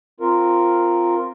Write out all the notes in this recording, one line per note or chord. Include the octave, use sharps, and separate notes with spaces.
C4 F4 A#4